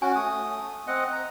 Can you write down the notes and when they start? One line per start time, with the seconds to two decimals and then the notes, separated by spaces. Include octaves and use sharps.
0.02 C#4 F#4 G#5
0.16 A3 D#6
0.87 C4 D#5 F#5
1.12 A#5